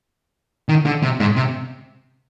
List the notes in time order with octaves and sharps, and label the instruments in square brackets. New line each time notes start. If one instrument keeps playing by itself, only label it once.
[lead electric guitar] D#3
D3
C3
G#2
C3